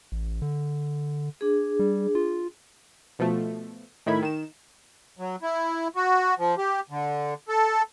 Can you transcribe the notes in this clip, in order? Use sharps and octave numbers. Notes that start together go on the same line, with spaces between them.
A1
D3
D4 G#4
G3
F4
B2 F3 A3
A2 D#3 E4 B5 G#6
D#3 E7
F#3
E4
F#4
F3
G4
D3
A4